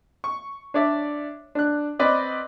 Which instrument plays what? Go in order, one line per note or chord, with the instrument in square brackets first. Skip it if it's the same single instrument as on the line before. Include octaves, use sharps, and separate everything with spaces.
[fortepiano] C#6
D4 C#5 D5 E5
D4 F#6
C4 B4 D5 D#5